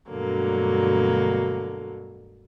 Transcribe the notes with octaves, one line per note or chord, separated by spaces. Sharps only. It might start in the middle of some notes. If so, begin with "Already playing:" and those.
D2 G2 B2 D3 F#3 A#3